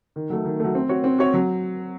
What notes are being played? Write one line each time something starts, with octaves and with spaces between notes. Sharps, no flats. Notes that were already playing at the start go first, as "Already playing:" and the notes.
D#3
F#3 A3
D#3
F#3 A3
C4
F#4 C#5
C4
F#4 C#5
F#3